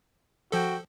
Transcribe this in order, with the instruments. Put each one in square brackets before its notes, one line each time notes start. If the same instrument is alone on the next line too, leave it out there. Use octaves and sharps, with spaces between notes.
[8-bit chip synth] F3 A4 [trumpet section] F#4 G5